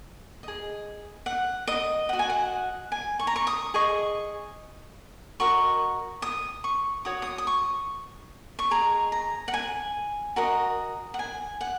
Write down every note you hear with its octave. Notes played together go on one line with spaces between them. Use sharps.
G#4 D#5
F#5
D#5
F#4 D#5 F#5
G#5
F#5
G#5
C#6
A#5
C#6
D#6
G#4 D#5 C#6
F#4 A#4 D#5 C#6
D#6
C#6
F#4 C#5 D#6
D#6
D#6
C#6
C#6
G#4 D#5 A#5
A#5
F#5
G#5
F#4 A#4 D#5
F#5
G#5
F#5